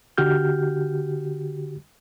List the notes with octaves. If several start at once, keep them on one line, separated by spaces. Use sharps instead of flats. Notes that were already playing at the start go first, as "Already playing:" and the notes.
D3 F#4 G4 F6 G6